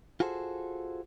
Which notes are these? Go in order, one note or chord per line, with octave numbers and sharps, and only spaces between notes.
F4 F#4 G#4 A4 C5